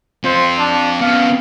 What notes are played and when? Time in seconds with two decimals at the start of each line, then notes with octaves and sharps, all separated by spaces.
0.25 C4 F4 C5
0.58 D4
1.01 C#3 B3 F5